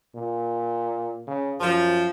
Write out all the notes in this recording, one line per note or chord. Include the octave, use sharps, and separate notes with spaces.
A#2
C#3
F#2 F3